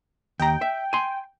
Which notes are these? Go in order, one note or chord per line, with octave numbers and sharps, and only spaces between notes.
D#2 G5 A#5
E5
G#5 C6